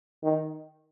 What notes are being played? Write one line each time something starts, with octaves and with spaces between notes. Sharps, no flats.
D#3